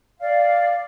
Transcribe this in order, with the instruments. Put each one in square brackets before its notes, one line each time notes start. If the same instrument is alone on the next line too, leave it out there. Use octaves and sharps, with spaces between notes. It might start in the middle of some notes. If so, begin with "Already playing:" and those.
[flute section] D5 F5